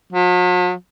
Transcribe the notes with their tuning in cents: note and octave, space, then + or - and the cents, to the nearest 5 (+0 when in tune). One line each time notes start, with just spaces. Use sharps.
F#3 -45